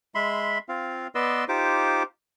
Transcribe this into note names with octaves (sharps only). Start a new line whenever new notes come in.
G#3 E5 B5 C6
C4 F4 F5
B3 B4 D5 D#5 C6 E6
D#4 F4 G4 C5 D6